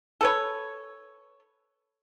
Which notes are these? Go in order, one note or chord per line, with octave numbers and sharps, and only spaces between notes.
A4 B4 C#5